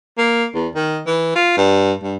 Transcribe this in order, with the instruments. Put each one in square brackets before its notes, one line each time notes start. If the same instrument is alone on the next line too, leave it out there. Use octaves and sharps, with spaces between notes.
[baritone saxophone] A#3
E2
D#3
E3
F4
G2
G2